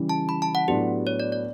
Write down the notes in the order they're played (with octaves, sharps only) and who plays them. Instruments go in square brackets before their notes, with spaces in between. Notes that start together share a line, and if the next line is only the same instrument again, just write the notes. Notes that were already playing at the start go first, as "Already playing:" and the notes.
Already playing: [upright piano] C#3 E3 G3
[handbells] A5
B5
A5
F#5
[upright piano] A2 F#3 B3 D4 [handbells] G4
[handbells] C#5
D5
D5